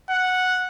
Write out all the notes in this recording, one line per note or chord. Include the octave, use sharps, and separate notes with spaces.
F#5